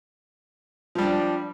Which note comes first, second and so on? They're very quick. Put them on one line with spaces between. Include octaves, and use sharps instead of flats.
F3 G3 D4